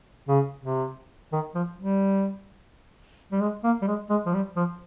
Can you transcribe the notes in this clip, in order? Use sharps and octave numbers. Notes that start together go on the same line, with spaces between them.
C#3
C3
D#3
F3
G3
G3
G#3
A#3
G3
G#3
G#3
F3
G3
F3